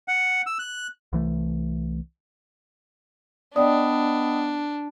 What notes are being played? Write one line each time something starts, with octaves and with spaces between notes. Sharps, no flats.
F#5
E6
F#6
C2 E3 A3
B3 D4 D5 D#5 G5 D#6